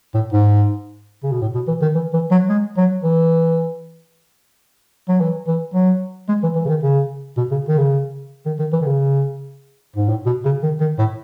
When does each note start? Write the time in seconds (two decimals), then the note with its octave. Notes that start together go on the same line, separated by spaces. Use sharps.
0.14 A2
0.33 G#2
1.24 C#3
1.31 B2
1.41 A2
1.55 B2
1.67 E3
1.82 D#3
1.95 E3
2.13 E3
2.31 F#3
2.49 G#3
2.77 F#3
3.04 E3
5.09 F#3
5.21 E3
5.47 E3
5.74 F#3
6.29 G#3
6.43 E3
6.56 E3
6.65 C#3
6.69 D#3
6.83 C#3
7.37 B2
7.51 C#3
7.68 D#3
7.78 C#3
8.46 D#3
8.59 D#3
8.73 E3
8.82 D#3
8.86 C#3
9.96 G#2
10.09 A2
10.26 B2
10.45 C#3
10.63 D#3
10.80 D#3
10.98 A2